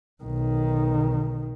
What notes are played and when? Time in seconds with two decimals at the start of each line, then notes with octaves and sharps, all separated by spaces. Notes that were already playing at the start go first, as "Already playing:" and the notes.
0.24 B1 D#3